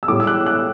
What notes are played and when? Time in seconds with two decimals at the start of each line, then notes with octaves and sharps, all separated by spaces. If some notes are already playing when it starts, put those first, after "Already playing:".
0.03 E6
0.08 A2 G3 D6
0.20 E6
0.27 F#6
0.46 F#6